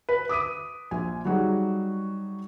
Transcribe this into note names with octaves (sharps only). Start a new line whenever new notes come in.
B4
D6 D#6 B6 D#7
A#1 G#5
F#3 G3 D#4 F#4 G#4